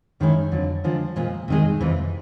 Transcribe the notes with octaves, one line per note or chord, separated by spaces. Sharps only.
F#2 D#3 G#3 C#4 E4
F2 D3 F#3
D3 F3 G#3
A#2 F3 G#3
C3 D#3 G#3
F2 C3 E3